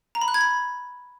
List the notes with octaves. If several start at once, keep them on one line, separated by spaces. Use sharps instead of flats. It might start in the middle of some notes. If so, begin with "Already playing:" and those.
A#5
B5
F#6
G#6
B5